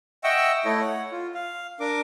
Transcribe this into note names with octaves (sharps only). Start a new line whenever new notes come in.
D#5 E5 F#5 G5 C#6 E6
A3 E4 A4 C#5 D#5
C#5 F#5
F4
F5
D4 A#4 D6